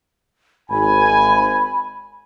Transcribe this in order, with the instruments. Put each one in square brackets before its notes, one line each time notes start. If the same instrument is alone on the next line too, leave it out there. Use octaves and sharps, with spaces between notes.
[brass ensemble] G#1 G#5 [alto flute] B5